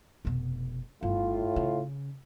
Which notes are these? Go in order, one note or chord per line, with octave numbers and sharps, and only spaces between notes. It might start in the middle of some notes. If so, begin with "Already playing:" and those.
F1 B2
G1 A2 F4
C#3